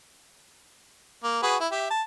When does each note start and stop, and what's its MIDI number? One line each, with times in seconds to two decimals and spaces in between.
1.24 1.41 58
1.43 1.57 66
1.43 1.57 68
1.43 1.57 71
1.60 1.68 64
1.71 1.88 67
1.71 1.88 76
1.90 2.02 81